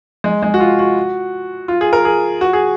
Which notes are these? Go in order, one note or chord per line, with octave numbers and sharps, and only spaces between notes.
G#3
G#3
F#4
F4
F#4
F4
G#4
A#4
G#4
F#4
G#4